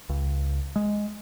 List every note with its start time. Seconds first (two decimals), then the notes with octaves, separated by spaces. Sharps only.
0.09 C#2
0.76 G#3